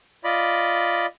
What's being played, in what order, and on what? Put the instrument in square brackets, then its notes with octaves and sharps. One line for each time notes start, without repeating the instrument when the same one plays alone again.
[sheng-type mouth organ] F4 D5 D#5 B5